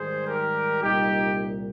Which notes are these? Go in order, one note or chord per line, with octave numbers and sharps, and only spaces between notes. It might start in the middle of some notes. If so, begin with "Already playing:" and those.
Already playing: G#2 D#3 G3 G#4 C5
G4 A#4
C2 A#2 G3 D#4 G4